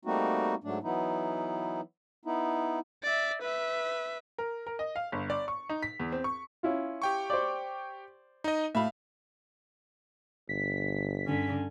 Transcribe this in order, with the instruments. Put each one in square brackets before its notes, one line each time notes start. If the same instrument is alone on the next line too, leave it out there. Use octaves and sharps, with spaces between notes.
[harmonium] G3 A3 A#3 C4 D#4 F#4
G#2 F#3 A3 D4
E3 F#3 B3 D#4 E4
B3 D#4 E4
[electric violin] D5 E5
B4 E5
[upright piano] A#4
A#4
D#5
F5
G1
D5
C#6
D#4
B6
E2
C4
C#6
[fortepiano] C#4 E4 F4
[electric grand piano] G4 G5 C#6
[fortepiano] C5 D5
[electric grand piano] D#4 D#5
[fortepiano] A2 B5 [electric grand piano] E5 F5
[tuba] G1 [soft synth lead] B6
[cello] G2 D3 [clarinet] C#4